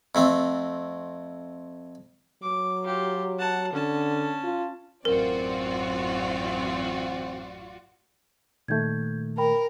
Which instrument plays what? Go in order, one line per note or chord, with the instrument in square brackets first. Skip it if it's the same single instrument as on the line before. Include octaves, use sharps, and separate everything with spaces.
[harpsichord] F2 A3 C4
[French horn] F#3 [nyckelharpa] D6
[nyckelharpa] F4 G4
F#5 A5
[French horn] D3 [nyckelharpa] C#4 A5
[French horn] F4
[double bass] A1 F#2 [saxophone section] E3 C4 [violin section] F4 F#4 D5 [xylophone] A#4
[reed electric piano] A#2 D#3 A3 [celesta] G6 G#6
[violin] A#4 [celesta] G5 B5